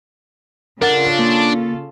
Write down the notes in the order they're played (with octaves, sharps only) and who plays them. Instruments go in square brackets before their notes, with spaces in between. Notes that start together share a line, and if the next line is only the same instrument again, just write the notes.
[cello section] C#3 F4 A4 [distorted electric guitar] D4 [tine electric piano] A#4 F#5 A6
[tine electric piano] A#3